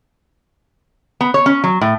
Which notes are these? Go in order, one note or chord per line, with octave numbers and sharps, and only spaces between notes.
B3
C#5
C#4
F#3
A2